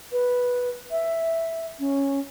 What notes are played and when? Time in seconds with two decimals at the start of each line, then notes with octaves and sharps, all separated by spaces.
0.12 B4
0.91 E5
1.80 C#4